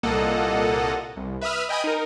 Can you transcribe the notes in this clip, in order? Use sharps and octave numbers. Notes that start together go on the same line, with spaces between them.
C2 A#2 A#3 A4 D#5 F#5
C2
B4 E5 B5 D#6 F6
D#5 G5 G#5 B5 D#6
D#4 A#4